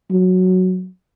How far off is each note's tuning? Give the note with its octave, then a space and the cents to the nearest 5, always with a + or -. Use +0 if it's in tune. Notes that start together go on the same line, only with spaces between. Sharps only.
F#3 -5